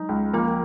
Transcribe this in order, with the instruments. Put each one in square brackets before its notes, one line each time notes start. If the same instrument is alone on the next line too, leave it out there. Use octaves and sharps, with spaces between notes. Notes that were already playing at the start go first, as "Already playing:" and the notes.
Already playing: [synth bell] F#3 G#3 [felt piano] D#4
[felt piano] C#2
[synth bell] F3 F4 [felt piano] A#3